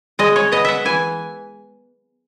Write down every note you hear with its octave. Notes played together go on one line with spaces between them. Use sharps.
G#3 D#5
C#5
B3 D#5
E5 F#5
E3 G#5